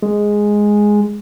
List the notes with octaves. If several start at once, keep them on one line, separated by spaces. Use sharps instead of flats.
G#3